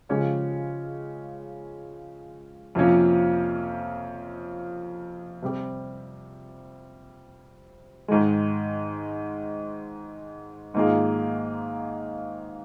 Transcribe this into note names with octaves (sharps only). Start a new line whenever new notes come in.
C#3 F3 G#3 C#4 G4
F2 C3 F3 A#3 C#4
C3 G3 C4 G4
G#2 D#3 G#3
G#2 D#3 A#3 F4 G#4